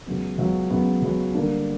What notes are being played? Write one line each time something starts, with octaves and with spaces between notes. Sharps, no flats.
C#2 C#3 F#3 B3
C#2 C#3 F#3 B3
C#2 C#3 F#3 B3
C#2 C#3 F#3 B3
D3 G3 A#3 D4